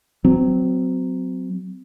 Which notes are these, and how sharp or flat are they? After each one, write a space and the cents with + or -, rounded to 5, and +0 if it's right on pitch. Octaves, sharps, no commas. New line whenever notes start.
F#3 +0 C4 -30